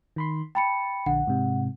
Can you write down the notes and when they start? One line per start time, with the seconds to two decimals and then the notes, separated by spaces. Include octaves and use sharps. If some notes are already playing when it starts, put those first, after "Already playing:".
0.16 D#3 B5 C6
0.55 G5 A5 B5 C#7
1.06 A#1 D3 F#5
1.27 G#2 C3